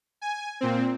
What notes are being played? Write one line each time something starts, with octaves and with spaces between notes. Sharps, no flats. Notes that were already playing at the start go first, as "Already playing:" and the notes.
G#5
A#2 C4